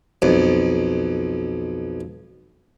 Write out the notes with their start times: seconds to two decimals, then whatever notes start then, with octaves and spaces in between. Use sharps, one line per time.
0.22 B1 F2